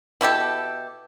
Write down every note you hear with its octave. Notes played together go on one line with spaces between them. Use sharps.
B2 E4 G4 A4